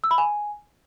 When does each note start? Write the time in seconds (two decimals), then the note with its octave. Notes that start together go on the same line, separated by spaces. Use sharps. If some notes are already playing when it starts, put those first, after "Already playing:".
0.04 E6
0.11 B5
0.18 G#5